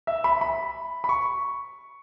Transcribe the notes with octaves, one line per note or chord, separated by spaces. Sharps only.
E5
B5
B5
B5
C#6